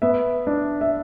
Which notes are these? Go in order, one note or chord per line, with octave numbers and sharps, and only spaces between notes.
B3 E5
D4
E5